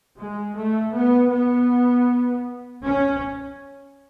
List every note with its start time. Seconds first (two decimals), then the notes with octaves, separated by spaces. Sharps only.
0.18 G#3
0.56 A3
0.94 B3
1.33 B3
2.84 C#4